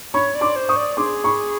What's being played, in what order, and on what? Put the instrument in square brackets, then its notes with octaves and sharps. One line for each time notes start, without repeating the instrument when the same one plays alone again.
[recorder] C#5 [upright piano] B5 C#6
[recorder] D5
[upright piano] C6 D6
[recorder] C5
[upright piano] C#6 D#6
[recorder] D5
[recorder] G#4 [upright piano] C6 D6
[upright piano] B5 C#6